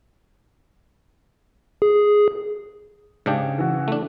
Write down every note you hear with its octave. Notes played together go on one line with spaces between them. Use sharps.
G#4
G#2 C#3 D4 G4
E3 F#4
A3 D4